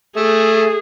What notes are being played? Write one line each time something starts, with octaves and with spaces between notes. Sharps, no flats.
A3 G#4